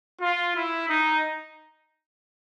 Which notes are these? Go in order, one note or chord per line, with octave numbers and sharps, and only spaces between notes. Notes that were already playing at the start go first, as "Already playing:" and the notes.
F4
E4
D#4